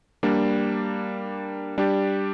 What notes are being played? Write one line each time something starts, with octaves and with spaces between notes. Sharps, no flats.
G3 A#3 D4
G3 D4 G4